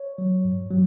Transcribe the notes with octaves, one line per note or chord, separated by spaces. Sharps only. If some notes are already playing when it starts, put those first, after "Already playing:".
Already playing: C#5
F#3
G2
F#3